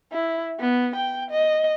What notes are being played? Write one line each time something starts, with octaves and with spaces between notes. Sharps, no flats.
E4
B3
G5
D#5